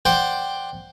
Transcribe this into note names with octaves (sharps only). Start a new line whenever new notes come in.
C5 D5 F#5 G5